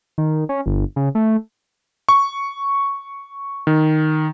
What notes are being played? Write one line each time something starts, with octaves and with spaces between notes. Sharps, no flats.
D#3
C#4
G1
C#3
A3
C#6
D#3